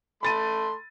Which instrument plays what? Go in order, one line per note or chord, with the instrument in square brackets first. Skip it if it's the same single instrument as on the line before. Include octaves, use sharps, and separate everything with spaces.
[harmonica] A3 A4 C6 [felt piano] B5 A6 D#7